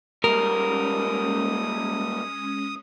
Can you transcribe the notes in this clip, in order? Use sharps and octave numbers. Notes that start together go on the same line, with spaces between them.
G3 G#3 A#3 C#4 A#4 D#6